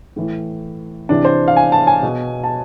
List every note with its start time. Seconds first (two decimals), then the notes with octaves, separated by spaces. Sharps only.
0.16 A2 E3
1.09 C3 E3 D4
1.25 C5
1.48 F5
1.56 G#5
1.72 A5
1.87 G#5
2.03 B2
2.44 A5